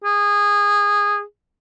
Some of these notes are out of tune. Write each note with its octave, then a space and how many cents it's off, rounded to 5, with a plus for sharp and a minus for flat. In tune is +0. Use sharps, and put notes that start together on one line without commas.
G#4 -20